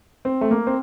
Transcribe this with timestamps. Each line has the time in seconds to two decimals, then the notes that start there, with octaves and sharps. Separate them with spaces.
0.25 C4
0.41 A3
0.51 A#3
0.67 C4